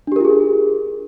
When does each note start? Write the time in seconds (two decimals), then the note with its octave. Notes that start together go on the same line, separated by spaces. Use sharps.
0.07 D4
0.12 G4
0.16 A#4
0.20 F4
0.25 G#4